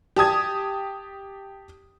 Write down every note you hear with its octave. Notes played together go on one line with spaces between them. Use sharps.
G4 A5 D#6 G#6